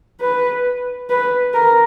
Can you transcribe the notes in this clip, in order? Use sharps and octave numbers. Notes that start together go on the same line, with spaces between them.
B4
B4
A#4